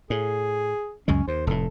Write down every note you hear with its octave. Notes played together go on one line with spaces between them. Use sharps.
A2 G#4
C#2 F#2 G#3 C#4
D#2 C5
F1 A2 A4